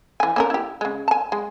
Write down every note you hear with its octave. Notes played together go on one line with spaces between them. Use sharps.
E3 G#5
A#3 C#4 A#4
E4 G4
C#3 G#3
G#5 A5
G#3